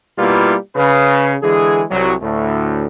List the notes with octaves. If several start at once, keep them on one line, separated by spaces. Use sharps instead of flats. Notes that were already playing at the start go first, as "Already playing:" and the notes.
B2 G3 A#3 E4 F4 B4
C#3 B4
D3 E3 G#3 G#4
C2 F#3
D2 A2 A3